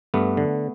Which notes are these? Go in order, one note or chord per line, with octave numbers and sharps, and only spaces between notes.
G2 A3 B3
D3